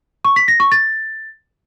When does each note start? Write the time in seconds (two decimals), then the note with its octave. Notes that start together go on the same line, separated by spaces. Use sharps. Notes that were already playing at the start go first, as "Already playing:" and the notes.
0.25 C#6
0.36 B6
0.48 A#6
0.60 C#6
0.72 A6